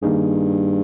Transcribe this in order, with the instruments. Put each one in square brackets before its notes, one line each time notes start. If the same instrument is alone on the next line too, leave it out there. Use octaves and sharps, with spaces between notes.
[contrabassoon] G2 [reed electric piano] D#3 A#3 D#4 G#4